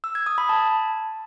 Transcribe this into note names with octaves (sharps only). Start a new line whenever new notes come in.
E6
G#6
D#6
B5
A5